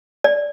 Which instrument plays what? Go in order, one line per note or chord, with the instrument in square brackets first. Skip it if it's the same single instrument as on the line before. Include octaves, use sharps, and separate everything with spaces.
[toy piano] D5